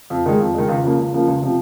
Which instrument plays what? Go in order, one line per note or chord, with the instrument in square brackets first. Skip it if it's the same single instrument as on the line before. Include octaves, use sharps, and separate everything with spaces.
[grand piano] F2
D#3 G#3
F2
D#3 G#3
C#2
C#3 F3 A#3
C#2
C#3 F3 A#3
C#2
C3 F3 C4